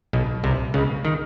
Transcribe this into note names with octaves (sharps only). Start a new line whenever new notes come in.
B1 B2
C2 C3
C#2 C#3
D#3